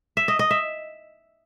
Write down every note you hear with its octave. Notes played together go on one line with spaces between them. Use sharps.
E5
D#5
D#5
E5